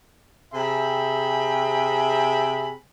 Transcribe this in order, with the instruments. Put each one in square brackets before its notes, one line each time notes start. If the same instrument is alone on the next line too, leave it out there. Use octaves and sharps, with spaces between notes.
[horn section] C3 G#4 E5 G5 B5